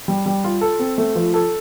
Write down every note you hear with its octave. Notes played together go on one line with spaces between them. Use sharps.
G3
G3
F4
A4
C4
A3
F3
A4